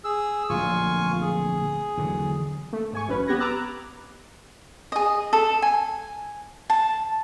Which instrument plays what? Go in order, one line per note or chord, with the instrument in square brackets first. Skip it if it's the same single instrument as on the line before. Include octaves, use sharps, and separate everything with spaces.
[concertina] G#4 E6
[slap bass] D1 A#1 A#2 [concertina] F4 G#5 C#6
[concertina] G#4
[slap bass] E2 D3 F#3
[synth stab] A3
G#2 G#5 C#6
A1 F#2 C#4 B4
B3 G4 F#6 G#6 A#6
B4 A#5 D6 E6 F#6 A6
[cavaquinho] G#4 D#5
A4
G#5
A5